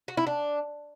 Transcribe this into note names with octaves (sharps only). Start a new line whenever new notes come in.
F#4
E4
D4